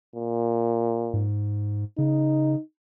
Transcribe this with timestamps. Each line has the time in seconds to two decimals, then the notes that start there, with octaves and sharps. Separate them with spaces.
0.16 A#2
1.13 G#2
1.98 C#3 D#4